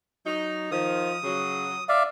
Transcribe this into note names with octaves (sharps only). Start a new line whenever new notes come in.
F#3 D#4
D#3 F3 D#6
C#3 F#3
D5 E5 F5